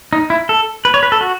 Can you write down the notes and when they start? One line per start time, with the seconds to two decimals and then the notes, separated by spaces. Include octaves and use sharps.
0.13 D#4
0.30 E4
0.49 A4
0.85 B4
0.94 C#5
1.03 B4
1.12 A4
1.21 F#4